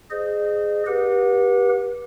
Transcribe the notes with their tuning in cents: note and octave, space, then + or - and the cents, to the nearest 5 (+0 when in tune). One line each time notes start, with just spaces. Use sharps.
G#4 +0 C5 -25 D#5 -35
G4 +0 B4 -35 F#5 -35